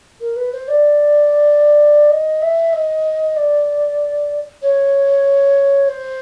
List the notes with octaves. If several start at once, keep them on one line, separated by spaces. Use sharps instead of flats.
A#4
B4
C5
D5
D#5
E5
D#5
D5
C#5
C5